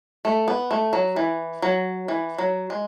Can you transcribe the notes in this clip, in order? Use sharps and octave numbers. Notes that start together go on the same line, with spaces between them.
A3
B3
A3
F#3
E3
F#3
E3
F#3
G#3